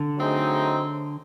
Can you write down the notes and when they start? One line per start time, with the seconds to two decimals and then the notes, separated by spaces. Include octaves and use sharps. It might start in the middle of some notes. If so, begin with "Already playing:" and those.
Already playing: D3
0.16 F#3 A3 C4 D#4 G#4